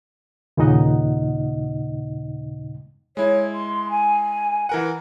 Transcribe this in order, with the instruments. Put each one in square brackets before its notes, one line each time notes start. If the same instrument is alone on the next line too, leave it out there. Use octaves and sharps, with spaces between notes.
[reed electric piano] D#2 A#2 C#3 D#4 D#5 F#5
[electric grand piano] G#3 E4 [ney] C#5
[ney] C6
G#5
[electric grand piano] E3 A#4 F#5